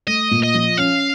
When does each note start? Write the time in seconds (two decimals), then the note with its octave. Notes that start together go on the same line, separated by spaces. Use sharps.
0.07 A3 D#5
0.31 A#2
0.43 D#5
0.54 F3
0.77 C#4 F5